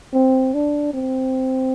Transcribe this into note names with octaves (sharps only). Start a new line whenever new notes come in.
C4
D4
C4